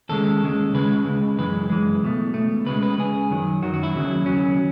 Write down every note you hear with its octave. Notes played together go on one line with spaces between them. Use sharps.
D#2 C#3 G#3 A4
D#2 C#3 G#3
C#2 C#3 G#3 B4
C#2 C#3 G#3
F#2 E3 G#3 B4
F#2 E3 G#3
C#2 B2 A3
C#2 B2 A3
C#2 C#3 G#3 B4
B4
C#2 C#3 G#3 G#4
F#2 D#3 F#3
F#2 D#3 F#3 F#4
F#4
E4
D#2 C#3 F#3
D#2 C#3 F#3 C#4